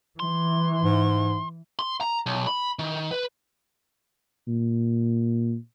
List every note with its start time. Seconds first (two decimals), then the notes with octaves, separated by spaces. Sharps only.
0.20 E3 C6
0.82 G#2
1.79 C6
2.01 A#5
2.26 B1
2.47 B5
2.79 D#3
3.11 B4
4.48 A#2